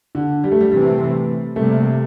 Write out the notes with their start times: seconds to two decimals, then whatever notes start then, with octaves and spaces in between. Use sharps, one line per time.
0.15 D3
0.44 G3
0.52 A3
0.61 G3
0.71 C3 E3 G3 A3 C4
1.56 C3 G3 A3 A#3